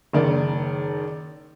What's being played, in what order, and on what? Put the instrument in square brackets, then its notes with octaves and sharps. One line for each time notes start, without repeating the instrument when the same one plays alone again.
[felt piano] F#1 D#3 D5